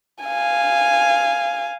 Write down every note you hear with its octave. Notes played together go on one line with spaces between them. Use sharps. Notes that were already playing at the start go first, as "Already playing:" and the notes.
F5 G#5